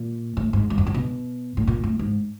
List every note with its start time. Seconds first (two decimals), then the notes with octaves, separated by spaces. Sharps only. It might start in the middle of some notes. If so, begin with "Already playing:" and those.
Already playing: A#2
0.37 A2
0.53 G#2
0.70 G2
0.78 F2
0.87 G2
0.94 B2
1.57 A2
1.67 A#2
1.84 A2
1.99 G#2